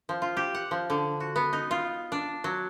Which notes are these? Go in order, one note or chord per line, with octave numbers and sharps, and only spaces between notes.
F3
F4
G4
F#5
F3
D3
F#4
B3
D#4
F4
D4
F#3